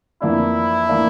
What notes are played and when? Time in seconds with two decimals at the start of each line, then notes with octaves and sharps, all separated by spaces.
0.22 F2 E3 A#3 D4 E4
0.89 E3 A#3 D4